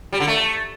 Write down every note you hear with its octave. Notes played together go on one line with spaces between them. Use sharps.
G3
D3
A3